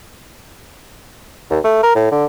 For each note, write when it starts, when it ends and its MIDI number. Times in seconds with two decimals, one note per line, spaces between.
1.51 1.59 39
1.64 1.78 57
1.83 1.92 70
1.95 2.07 45
2.12 2.25 50